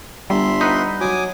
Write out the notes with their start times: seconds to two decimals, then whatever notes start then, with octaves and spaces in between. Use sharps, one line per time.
0.30 G1 G3 E5 C6
0.61 D#4 B4 F#5
1.01 F#3 G#5 D6 D#6